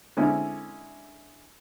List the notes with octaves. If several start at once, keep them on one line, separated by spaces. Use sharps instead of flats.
D3 G#3 C4 C#4 E4